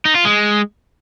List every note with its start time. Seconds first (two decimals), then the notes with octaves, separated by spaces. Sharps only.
0.05 D#4
0.15 F4
0.25 G#3